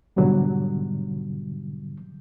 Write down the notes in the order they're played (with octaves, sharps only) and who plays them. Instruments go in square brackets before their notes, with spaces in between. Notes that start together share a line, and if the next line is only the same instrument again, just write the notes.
[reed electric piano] G#2 B2 D3 F#3 G3